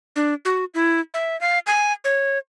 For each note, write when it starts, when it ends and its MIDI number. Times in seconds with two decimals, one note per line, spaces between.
0.16 0.34 62
0.45 0.65 66
0.74 1.00 64
1.14 1.39 76
1.41 1.59 77
1.67 1.93 80
2.04 2.38 73